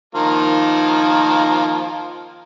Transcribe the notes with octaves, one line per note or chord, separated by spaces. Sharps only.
D#3 F3 A#3